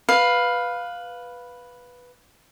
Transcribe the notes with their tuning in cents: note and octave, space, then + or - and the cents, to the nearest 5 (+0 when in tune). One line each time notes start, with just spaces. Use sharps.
B4 +0 F5 +10